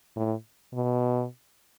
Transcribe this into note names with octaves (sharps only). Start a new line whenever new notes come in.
A2
B2